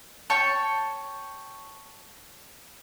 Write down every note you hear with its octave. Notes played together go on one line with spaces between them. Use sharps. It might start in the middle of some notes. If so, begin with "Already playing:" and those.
C#5 G5 A5 C#6